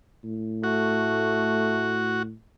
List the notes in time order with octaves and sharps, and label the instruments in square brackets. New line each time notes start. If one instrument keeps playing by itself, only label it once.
[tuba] A2
[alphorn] A3 [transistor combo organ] F#4